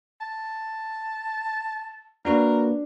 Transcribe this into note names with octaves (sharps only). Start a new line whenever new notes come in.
A5
A#3 D4 F#4 A#4 B4